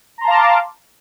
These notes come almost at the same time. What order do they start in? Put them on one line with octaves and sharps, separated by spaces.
A#5 C6 A5 F5 D6